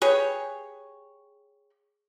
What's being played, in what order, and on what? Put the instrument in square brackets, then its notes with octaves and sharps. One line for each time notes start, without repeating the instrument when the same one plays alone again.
[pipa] G4 G#4 B4 C#5